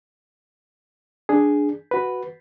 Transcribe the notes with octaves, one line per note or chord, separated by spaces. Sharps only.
D4 G#4
F#4 B4